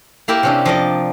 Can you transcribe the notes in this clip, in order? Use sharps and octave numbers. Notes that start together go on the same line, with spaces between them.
A#3 E4 G4 A#4
C3 C#4 D4
F3 D5 D#5